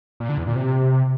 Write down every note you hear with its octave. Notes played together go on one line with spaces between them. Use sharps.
A#2
D3
E2
A#2
C3